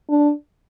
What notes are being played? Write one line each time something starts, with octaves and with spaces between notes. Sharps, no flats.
D4